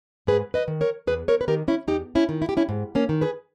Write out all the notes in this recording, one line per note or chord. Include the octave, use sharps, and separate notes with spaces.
G#2 G#4 B4
B4 D#5
D#3
A#4 C#5
E2 G#4 B4
A#4 C#5
B4
D#3 G4 A#4
C#4 E4
E2 D#4 G4
C#4 E4
D#3
E4
G4
C#4 E4
G#2
A#3 C#4
D#3
G#4 B4